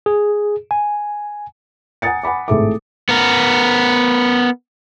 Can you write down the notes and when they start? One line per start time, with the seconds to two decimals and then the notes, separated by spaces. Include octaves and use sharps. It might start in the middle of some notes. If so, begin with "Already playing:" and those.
0.06 G#4
0.71 G#5
2.02 F#5 G#5 A#5 D#6 A6 C#7
2.23 F#5 G#5 B5 D6
2.48 G#1 A2 G#4 A4 E5 D6
3.09 B3 A#4